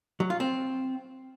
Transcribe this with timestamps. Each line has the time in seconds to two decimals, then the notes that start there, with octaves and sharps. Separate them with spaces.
0.20 F#3
0.30 F4
0.40 C4